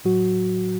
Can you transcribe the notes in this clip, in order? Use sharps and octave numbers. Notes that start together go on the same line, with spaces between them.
A2 F#3 F#4